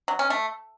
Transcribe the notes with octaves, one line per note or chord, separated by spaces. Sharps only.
F#3
C#4
A3